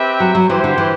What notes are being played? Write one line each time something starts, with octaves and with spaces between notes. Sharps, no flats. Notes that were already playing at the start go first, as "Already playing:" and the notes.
Already playing: C4 G4 B4 E5
F#3
F#3
E3 E4 G4 C5
D3
E3